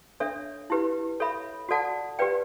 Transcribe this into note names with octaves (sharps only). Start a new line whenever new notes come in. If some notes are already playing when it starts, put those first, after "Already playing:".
D4 A4 C#5 E5
E4 G4 B4
A4 C#5 E5 B5
F#4 A4 D5 F#5 A5
G4 B4 D5 G5